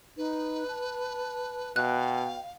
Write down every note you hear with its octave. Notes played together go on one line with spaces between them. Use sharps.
D#4 B4
A5
B2 F5 G5 F#6